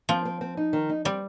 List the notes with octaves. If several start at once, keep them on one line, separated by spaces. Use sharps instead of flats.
F3 C4
C4
C4
D#4
D#3
D#4
G3 C4